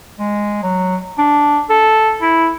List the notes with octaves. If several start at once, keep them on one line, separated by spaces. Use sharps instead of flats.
G#3
F#3
D4
A4
E4